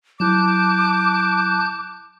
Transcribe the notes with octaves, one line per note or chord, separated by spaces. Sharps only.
F#3 E4 A5 D6 F#6 G6